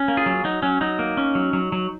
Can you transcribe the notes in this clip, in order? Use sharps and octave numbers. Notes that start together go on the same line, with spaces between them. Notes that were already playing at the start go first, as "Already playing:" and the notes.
Already playing: C#4
A#3
F4 G#4
F#3
F#3 D#4
F#3 C#4
F#3 D#4
A#3
C#4
F#3
F#3
F#3